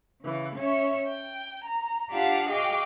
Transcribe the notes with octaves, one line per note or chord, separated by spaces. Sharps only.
C#3 E3
C#4 C#5 E5
G5
A#5
D4 F4 G4 F5 F#5 A5
F#4 G#4 D#5 F5 G5 D6